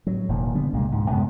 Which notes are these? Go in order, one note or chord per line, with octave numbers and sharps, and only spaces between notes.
A2 F#3
F1 A#2 D#3
D3 G3 B3 D4
C2 A#2 C#3 G#3
C#2 G#2 B2
F#2 C3 G#3 B3